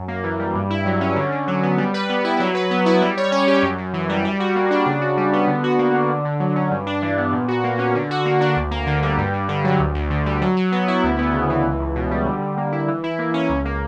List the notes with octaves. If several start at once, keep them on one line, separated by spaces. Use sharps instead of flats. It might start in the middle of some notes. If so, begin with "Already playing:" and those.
Already playing: F#2
A#3
E3
G3
G2
E4
F#3
C#4
D3
D3
F#3
B3
G3
B4
B3
E4
F#3
B4
B3
E4
G3
C#5
C#4
G4
F#2
F#2
E3
G3
G3
F#4
A#3
D4
C#3
F#4
G3
B3
D3
F#4
A#3
D4
D3
D3
F#3
C#4
G2
D4
E3
B3
A#2
F#4
A#3
C#4
D3
F#4
A#3
D4
D2
A#3
D3
G3
G2
G2
D3
F#3
D2
D2
D3
G3
F#3
F#3
B3
E4
D2
B3
C#3
E3
C#2
C#2
B2
G3
D3
D3
A#3
E4
E3
E4
A#3
C#4
C#2
A#3